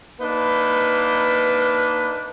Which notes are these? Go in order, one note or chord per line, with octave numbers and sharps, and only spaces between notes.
A#3 D4 D#4 B4